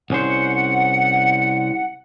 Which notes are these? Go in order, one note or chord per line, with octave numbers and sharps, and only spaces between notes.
C2 C#4 C5 F#5